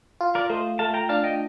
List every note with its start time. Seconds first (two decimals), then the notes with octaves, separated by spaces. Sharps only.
0.21 F4
0.35 A#4 D5
0.50 A3 C5 D#5
0.79 A3 F5 A5
0.94 G5 A#5
1.09 D4 F5 A5
1.24 D#5 G5